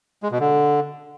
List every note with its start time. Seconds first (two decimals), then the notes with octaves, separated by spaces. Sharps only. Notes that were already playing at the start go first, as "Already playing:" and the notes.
0.23 G#3
0.31 B2
0.40 D3